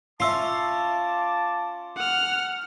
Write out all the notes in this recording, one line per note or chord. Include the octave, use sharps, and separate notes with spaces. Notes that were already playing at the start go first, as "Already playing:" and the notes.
C#4 F4 E5 A5 D6 E6 C7
F#5 F6